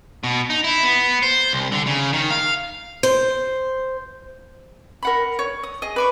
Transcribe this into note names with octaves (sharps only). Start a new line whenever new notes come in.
B2
D#4
E4
B3
C5
C2
D3
C#3
D#3
F5
C5
A#4 F#5 B5
C#5
D#6
G#4 D#5
B4 D5 C#6